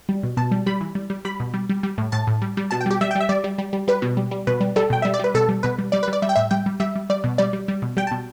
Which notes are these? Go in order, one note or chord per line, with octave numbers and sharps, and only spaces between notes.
G3
B2
B2 A5
G3
G3 B5
E3
G3
G3
G3 B5
B2
G3
G3
G3
A2
A2 A5
A2
G3
G3
B2 A5
G5
G3 G4
G3 E5
G5
G3
E5
G3 D5
G3
G3
G3
G3 B4
B2
G3
G3
B2 B4
G3
G3 A4
B2 G5
G3 E5
D5
G3 B4
B2 A4
G3
B2 B4
G3
G3 D5
B4
G3
D5
G3 E5
G5
A2 E5
G3 G5
G3
G3 E5
G3
G3 D5
B2
G3 D5
G3
G3
B2
G3 G5
A5
B2